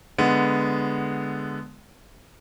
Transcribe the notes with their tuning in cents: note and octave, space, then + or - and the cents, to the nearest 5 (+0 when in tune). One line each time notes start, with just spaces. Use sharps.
D3 +0 G#3 +0 B3 +0